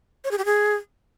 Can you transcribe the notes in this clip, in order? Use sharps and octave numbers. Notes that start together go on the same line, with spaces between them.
C#5
G#4
G4
G#4